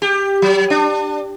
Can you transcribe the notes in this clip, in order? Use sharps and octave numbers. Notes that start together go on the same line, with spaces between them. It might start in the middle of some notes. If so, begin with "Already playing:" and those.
G4
F#3
D4